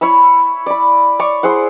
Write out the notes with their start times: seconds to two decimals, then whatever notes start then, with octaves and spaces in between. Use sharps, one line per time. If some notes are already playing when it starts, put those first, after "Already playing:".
0.01 E4 C#5 B5 E6
0.66 D5 B5
1.19 C#5 D5 C#6
1.43 E4 G#4 C5 F#5